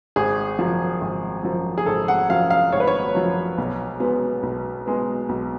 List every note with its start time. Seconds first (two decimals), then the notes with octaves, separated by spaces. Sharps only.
0.16 G#1 G#4
0.59 F#2 F3
1.01 G#1
1.43 F#2 F3
1.78 G#4
1.86 G#1 A4
2.08 F#5
2.29 F#2 F3 F5
2.50 F5
2.72 G#1 C#5
2.80 B4
2.87 C#5
3.15 F#2 F3
3.58 B1
4.00 B2 G#3 B3
4.43 B1
4.85 B2 G#3 B3
5.29 B1